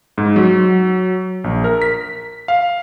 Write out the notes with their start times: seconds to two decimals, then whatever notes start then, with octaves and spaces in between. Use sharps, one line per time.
0.18 G#2
0.36 F#3
1.44 A#1
1.64 A#4
1.82 B6
2.48 F5